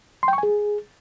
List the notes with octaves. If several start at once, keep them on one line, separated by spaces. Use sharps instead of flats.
C6
G5
C#6
G#5
G#4